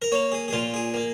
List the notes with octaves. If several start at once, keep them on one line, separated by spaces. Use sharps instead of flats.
A#4
A#3 C#5
G#4
G#4
A#2 F4
G#4
A#3